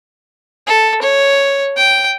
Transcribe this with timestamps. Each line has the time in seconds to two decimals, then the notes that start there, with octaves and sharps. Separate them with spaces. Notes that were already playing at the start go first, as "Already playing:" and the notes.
0.67 A4
1.02 C#5
1.77 G5